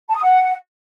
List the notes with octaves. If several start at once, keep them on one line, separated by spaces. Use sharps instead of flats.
A5
D#6
F#5